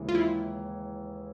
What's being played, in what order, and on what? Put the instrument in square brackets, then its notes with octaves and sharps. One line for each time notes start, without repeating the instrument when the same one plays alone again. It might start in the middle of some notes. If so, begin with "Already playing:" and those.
Already playing: [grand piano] D#2 C#3 E3 G#3
[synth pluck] F4
E4